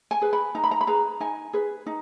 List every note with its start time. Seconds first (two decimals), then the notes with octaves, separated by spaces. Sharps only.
0.11 G#5
0.22 G#4 B4
0.33 B5
0.55 D#4 A#5
0.64 B5
0.71 A#5
0.81 B5
0.87 G#4 B4 A#5
1.20 D#4 G#5
1.53 G#4 B4
1.86 D#4